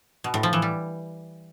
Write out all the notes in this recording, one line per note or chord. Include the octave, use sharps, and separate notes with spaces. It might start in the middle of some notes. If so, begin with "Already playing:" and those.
B2
A2
F3
E3
G3